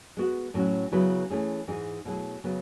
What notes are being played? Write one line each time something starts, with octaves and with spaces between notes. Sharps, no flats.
G#3 B3 F#4
A2 F#3 C#4 F#4
C#3 F#3 B3 E4 B4
E3 A3 C#4 E4 G#4
G#2 E3 G#3 D#4 G#4
B2 F#3 A3 E4 G#4
C#3 F#3 B3